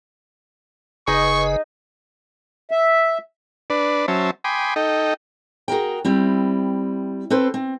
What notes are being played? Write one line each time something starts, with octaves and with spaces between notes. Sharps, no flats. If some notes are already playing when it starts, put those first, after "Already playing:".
F#1 C#3 D#4 G#4 B4 D#5 C#6
E5
D4 B4 D5
F#3 C#4 C5 E5 A5
G5 G#5 B5 C6 D6 D#6
D#4 A4 D#5 G5
F#4 G#4 A#4 G5
G3 C4 E4
C4 A4 B4 C5
C4